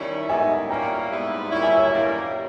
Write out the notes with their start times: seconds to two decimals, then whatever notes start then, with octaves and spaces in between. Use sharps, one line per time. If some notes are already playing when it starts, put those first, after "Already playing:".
Already playing: D#3 G3 C#4 E4
0.29 G#2 D#3 G3 B3 D#4 E5 G#5
0.69 A#2 G3 A#3 C#4 E4 G5 A#5
1.10 G#2 G3 B3 E4
1.50 A#2 G3 C#4 E4
1.63 E5 G#5
1.77 C#5 E5
1.91 G2 D#3 G3 A#3